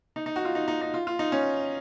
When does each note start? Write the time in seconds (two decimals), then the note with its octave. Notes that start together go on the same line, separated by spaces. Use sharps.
0.16 D#4
0.26 D#4
0.36 F#4
0.45 F4
0.55 D#4
0.68 D#4
0.81 D#4
0.94 F4
1.07 F4
1.19 D#4
1.32 C#4